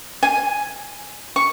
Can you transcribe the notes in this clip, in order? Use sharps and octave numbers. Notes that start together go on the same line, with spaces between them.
G#5
C#6